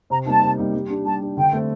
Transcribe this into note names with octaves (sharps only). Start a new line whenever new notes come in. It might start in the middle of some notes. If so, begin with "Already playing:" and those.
C3 A#5
G3 A#3 D#4 A5
C3
G3 A#3 D#4
G3
D4 G4
G3 A5
D4 G4
D3 G5
A3 C4